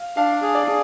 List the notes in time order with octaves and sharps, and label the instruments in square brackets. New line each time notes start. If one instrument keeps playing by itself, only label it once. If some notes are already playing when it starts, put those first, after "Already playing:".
Already playing: [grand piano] F5
[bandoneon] D4 [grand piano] F5
[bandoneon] G#4
[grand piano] D5
[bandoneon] G#4